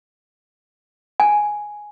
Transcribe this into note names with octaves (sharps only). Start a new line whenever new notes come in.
G#5